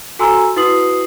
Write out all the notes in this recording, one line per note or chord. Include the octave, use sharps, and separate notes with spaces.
F#4 A4 G#5 A#5 C6 E6
E4 F#4 B4 D#6 C7 F#7